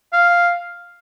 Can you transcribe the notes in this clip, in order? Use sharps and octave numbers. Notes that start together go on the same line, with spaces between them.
F5